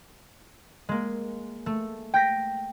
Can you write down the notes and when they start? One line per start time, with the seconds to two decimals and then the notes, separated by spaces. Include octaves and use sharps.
0.89 G#3 A#3
1.66 A3
2.14 G5 G6 A#6 B6